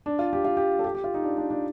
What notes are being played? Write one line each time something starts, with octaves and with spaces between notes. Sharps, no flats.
D4
F4
G4
F4
G4
A4
G4
G4
F4
D#4
D4
D4
D4